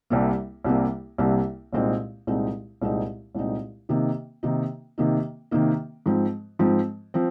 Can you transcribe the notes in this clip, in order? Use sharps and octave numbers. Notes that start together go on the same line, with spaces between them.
C2 C3 G3 A#3
C2 C3 G3 A#3
C2 C3 G3 A#3
C2 A#2 G#3 C4 D#4
C2 A#2 G#3 C4 D#4
C2 A#2 G#3 C4 D#4
C2 A#2 G#3 C4 D#4
C3 D#3 A#3 D#4
C3 D#3 A#3 D#4
C3 D#3 A#3 D#4
C3 D#3 A#3 D#4
G#2 F3 C4
G#2 F3 C4
F3 C4